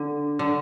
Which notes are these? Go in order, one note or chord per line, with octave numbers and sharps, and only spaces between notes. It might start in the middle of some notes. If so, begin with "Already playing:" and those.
Already playing: D3
D3